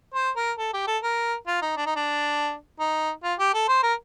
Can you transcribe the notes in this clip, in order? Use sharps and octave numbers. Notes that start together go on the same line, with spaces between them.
C5
A#4
A4
G4
A4
A#4
F4
D#4
D4
D#4
D4
D#4
F4
G4
A4
C5
A#4